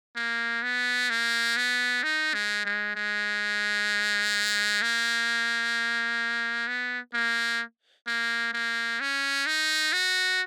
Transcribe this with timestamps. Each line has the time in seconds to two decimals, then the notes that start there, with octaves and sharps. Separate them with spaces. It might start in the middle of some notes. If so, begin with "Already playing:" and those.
0.16 A#3
0.63 B3
1.10 A#3
1.57 B3
2.03 D#4
2.34 G#3
2.65 G#3
2.96 G#3
4.82 A#3
6.67 B3
7.14 A#3
8.07 A#3
8.53 A#3
9.00 C#4
9.46 D#4
9.93 F#4